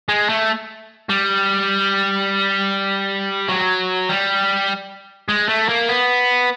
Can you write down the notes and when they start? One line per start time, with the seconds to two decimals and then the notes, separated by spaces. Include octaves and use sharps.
0.09 G#3
0.29 A3
1.09 G3
3.49 F#3
4.09 G3
5.29 G#3
5.49 A3
5.69 A#3
5.89 B3